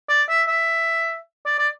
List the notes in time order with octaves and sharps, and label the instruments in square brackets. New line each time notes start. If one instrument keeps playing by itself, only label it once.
[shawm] D5
E5
E5
D5
D5